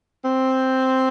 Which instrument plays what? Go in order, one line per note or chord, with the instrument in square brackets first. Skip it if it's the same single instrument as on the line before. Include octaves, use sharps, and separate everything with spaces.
[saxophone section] C4